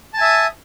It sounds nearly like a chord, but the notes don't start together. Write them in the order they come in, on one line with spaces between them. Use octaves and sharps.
A5 G#5 E5 D#6